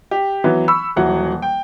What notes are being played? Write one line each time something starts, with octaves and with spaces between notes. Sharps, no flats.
G4
E3 F#3 B3
B5 C#6 E6
D#1 E3 F#3 F#5
G5